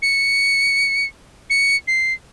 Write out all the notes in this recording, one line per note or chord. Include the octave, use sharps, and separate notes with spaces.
C#7
C#7
C7